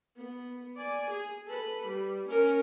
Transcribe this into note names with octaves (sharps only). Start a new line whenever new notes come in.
B3
D5 G#5
G#4
A4 B4
G3
C#4 A#4